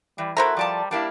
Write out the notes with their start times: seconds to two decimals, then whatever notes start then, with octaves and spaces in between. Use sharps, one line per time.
0.18 E3 G3
0.37 A3 E4 F#4 A#4 C5 A#5
0.57 F3 G3 D5 A5
0.91 G3 A#3 D4 E4